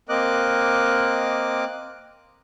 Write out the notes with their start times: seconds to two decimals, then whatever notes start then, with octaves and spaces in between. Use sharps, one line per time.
0.09 A#3 C4 A#4 D#5 D6 F#6